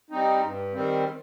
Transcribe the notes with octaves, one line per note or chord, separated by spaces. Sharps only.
G3 C4 D#4
G2
D#3 G3 C4